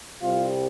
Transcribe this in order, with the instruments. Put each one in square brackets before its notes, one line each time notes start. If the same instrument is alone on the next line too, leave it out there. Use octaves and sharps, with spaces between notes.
[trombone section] C2 C3 G3 F4